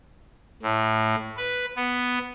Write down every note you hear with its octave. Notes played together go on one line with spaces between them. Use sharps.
A2
B4
B3